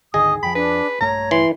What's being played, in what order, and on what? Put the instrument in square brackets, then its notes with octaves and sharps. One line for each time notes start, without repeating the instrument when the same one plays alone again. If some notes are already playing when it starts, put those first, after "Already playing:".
[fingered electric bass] G#1 D2 D#3 [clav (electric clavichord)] G#4 [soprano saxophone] D#5 [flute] D#6
[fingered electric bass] F2 F3 [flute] G5 [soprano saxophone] B5
[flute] D4 [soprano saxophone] B4
[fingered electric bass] A#1 G2 A3 [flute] C#5 [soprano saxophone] A#5
[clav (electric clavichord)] E3 [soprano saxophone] C6